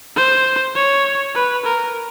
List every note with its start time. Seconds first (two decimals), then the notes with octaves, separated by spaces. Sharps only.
0.16 C5
0.75 C#5
1.35 B4
1.65 A#4